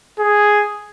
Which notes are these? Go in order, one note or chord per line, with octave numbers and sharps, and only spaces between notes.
G#4